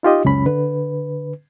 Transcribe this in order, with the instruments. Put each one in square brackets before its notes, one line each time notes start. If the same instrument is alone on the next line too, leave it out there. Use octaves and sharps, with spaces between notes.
[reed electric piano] D#4 F4 G4 D#5
C#2 F#2 C#4 B5
D3 B4